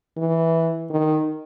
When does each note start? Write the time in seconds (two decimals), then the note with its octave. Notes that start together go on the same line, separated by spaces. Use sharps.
0.17 E3
0.90 D#3